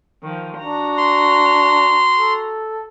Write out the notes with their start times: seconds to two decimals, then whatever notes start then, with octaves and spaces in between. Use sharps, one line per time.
0.23 D#3 F3
0.58 D4 F#4 A#5
0.98 C6
2.19 A4